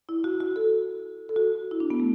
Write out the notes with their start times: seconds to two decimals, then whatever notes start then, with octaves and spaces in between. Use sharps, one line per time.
0.09 E4
0.24 F#4
0.40 F#4
0.56 A4
1.29 A4
1.36 F#4
1.71 E4
1.80 D4
1.90 B3
2.00 A3